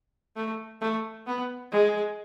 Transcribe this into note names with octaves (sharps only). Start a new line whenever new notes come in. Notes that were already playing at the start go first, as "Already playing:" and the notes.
A3
A3
B3
G#3